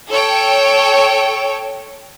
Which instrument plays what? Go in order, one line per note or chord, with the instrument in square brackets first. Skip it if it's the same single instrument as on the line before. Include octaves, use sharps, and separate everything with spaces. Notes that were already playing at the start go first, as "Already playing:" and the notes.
[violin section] A4 C#5 G5